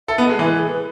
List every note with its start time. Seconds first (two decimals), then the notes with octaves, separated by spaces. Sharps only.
0.08 A4 E5
0.18 B3
0.23 D#5
0.29 G#3
0.39 E3 B4
0.50 A4
0.59 G#4
0.69 B4